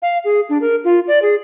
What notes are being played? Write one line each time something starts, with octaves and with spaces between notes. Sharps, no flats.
F5
G#4
D4
A#4
F4
D5
G#4